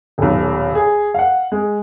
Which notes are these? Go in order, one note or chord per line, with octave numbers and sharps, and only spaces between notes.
D#1 B1
G#4
F5 F#5
G#3